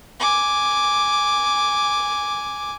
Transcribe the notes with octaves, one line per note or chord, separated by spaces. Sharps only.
G#5 D6